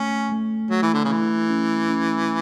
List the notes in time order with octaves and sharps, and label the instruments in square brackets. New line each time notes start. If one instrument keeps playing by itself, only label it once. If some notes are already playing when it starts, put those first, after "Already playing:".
Already playing: [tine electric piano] A3 [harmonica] C#4
[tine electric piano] A3
[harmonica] F#3 [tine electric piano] A3
[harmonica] E3
D3
C#3 E3
[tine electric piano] A3
C#4
C#4